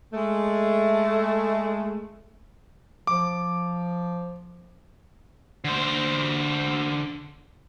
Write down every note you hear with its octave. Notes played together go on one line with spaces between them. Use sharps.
G#3 A3
F3 D6
D3 C5